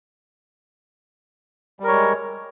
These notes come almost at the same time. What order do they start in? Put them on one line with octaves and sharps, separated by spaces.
G3 A#4 C#5 G#3